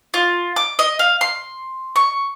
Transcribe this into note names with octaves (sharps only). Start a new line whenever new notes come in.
F4
D6
D#5
F5
C6
C#6